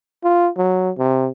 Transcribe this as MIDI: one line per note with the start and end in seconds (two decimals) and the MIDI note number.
0.24 0.49 65
0.57 0.90 54
0.98 1.29 48